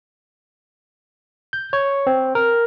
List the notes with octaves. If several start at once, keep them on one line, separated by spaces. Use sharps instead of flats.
G6
C#5
C4
A#4